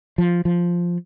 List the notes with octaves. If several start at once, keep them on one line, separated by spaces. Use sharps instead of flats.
F3
F3